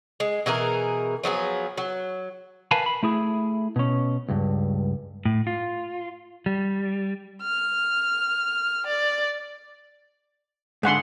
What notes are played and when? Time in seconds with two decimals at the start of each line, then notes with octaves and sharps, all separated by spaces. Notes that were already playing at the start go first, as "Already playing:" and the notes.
0.20 G#3
0.46 B2 E3 G#4 A#4
1.24 F3 F#3 B3 G#4
1.77 F#3
2.71 A#4 B4 F5 G#5 A5 B5
2.86 B5
3.03 A3 E4 G#4
3.76 B2 C#4
4.29 C#2 G2
5.25 A2
5.47 F4
6.46 G3
7.42 F6
8.87 D5
10.83 G#2 D3 G#4 F#5 C6